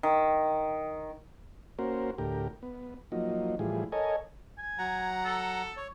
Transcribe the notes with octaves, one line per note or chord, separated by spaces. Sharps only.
D#3
A#3 C#4 F#4 A#4 C5
D2 A2 G4 A#4
B3
F3 F#3 A#3 D#4
A2 E3 F3 G3 G#4
A4 A#4 C#5 D#5 G#5
G#5
F#3 F#5 A#5
A4
C#5